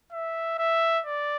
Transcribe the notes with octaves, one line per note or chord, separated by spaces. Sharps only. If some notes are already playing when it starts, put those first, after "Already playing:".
E5
E5
D5